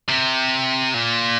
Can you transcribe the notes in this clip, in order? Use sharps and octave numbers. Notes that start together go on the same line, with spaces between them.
C3
A#2